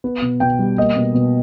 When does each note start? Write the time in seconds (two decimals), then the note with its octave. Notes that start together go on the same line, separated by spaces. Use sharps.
0.04 B3
0.22 B2
0.40 B2 G5
0.59 G3
0.78 A#3 D#5
0.96 B2
1.14 B2